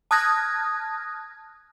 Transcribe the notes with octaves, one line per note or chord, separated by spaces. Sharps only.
A5 D#6 F6 F#6 G#6 A#6